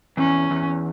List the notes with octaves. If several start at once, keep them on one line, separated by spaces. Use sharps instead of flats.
E2 C#4
E2